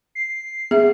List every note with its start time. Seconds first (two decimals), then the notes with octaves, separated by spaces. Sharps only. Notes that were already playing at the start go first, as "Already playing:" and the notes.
0.15 C7
0.71 B3 G#4 E5